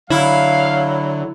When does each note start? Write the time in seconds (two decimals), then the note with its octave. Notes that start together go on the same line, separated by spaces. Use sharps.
0.10 D3 F#3 E4 F5